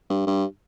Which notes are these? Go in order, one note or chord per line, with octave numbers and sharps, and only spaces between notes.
G2
G2